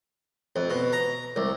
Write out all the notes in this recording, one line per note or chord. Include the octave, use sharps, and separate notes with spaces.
F2
B2
A#5
C2